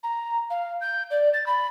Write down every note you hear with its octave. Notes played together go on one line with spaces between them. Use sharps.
A#5
F5
G6
D5
A6
B5